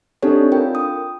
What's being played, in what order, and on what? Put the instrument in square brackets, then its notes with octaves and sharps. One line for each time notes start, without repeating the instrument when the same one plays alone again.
[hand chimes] C4 D4 D#4 G4 A4 C#5
F4 A#4 G5
D#6